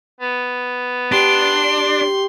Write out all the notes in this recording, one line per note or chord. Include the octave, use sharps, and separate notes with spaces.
B3
D4 G4 C6